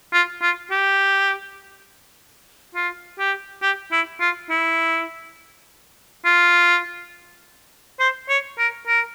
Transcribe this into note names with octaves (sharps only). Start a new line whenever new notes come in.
F4
F4
G4
F4
G4
G4
E4
F4
E4
F4
C5
C#5
A#4
A#4